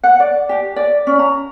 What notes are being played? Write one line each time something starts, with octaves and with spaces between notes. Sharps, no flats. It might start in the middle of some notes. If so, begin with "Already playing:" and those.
F#5
D5
G4
D5
C#4
A#5